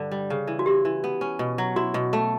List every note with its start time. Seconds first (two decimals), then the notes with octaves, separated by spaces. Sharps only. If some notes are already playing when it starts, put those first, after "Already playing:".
Already playing: G2 D3
0.12 G3
0.30 C#3
0.47 E3
0.59 F#4
0.66 E4 G4
0.85 E3
1.04 B3
1.21 C#4
1.39 B2
1.58 F#3
1.76 E4 F#4
1.94 B2
2.13 A3